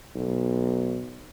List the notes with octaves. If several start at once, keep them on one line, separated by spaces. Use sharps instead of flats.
B1